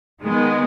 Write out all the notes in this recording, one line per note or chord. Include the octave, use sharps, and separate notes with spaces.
D#3 G#3 B3